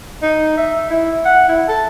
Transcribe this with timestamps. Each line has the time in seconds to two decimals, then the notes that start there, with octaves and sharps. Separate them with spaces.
0.22 D#4
0.57 E5
0.90 E4
1.25 F#5
1.49 E4
1.69 A4